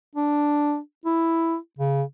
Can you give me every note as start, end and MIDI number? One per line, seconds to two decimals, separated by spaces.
0.15 0.78 62
1.05 1.57 64
1.79 2.03 49